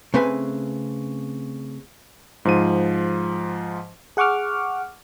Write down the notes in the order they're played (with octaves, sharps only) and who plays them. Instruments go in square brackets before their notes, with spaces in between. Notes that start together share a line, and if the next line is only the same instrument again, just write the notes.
[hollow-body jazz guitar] C#3 A3 C4 B4 G#5
[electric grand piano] G#2 F3 D#7
[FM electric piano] G#4 F#5 C#6 D6 F6